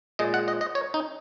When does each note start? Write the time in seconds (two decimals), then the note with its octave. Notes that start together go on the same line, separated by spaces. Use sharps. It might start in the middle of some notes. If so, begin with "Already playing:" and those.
0.19 A#2 G#3 D#5
0.34 F#5
0.48 D#5
0.61 D#5
0.75 C#5
0.94 D#4